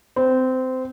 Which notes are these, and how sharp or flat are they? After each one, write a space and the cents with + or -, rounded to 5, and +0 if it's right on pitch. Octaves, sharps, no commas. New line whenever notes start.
C4 -20